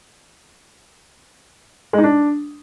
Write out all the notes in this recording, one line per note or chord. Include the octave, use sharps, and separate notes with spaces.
G#3
D#4
D4